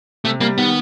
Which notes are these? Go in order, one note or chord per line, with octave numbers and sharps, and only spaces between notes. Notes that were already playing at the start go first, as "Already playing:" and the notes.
C3 A3
G3 A#3
D#3 B3